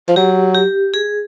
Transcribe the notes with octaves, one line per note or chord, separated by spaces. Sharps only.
F3
F#3 G4
G4
G#4